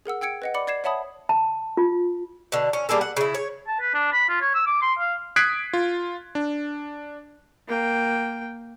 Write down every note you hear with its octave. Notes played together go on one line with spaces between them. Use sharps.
G#4 A#4 F#5 E6
G5 E6 G#6 C#7 D7
B4 D#5 F#5
D5 B5 D6 C#7
D5 G#6 C7 E7
C#5 E5 F#5 A5 B5 D#6
A5
F4
B2 D3
C#4
G3 A#3 G#4 A4
F#5
C#3 E4
C#5
A5
B4
D4
B5
F4
C#5
E6
D6
C6
F5
D#6 F#6 G#6 B6 C7 D7
F4
D4
A#3 G5